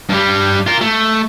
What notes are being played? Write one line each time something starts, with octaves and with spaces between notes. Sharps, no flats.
G2 G3
F4 A#4
A3